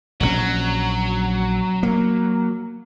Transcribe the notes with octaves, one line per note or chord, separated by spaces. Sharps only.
A#1 D#3 F#3 C#4
A#3